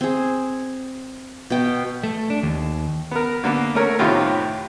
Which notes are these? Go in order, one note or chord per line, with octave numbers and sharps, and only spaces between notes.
C4 G#4
B2 G5
A3
D4
D#2
B3 A#4
D3 A#3 B3
A3 C#4 A#4 C#5
F#2 A2 C3 D#3 B3 F4